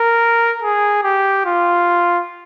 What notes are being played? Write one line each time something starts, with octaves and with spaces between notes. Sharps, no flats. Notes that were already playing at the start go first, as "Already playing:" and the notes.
Already playing: A#4
G#4
G4
F4